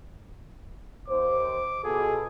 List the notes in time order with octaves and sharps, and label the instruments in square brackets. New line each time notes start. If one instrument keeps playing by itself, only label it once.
[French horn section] D#2 C5 [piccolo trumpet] D6
[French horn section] B2 F4 A4 [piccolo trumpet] G#4